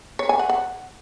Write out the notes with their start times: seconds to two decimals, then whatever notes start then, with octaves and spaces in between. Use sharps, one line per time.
0.19 C#5
0.29 G#5
0.39 F#5
0.49 F#5